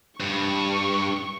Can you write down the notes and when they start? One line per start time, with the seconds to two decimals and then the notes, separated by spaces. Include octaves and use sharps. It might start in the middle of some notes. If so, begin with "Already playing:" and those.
0.20 G2 C#6